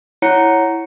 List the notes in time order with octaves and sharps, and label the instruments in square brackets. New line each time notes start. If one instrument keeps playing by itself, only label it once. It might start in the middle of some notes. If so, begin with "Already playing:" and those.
[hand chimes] E4 C#5 F#5 A#5 C#7